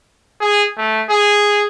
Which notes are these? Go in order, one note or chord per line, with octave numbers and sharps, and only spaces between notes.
G#4
A3
G#4